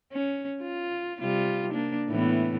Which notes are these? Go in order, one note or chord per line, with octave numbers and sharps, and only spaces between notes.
C#4
F4
C3 G3 F4
A#3 D4
A2 E3 B3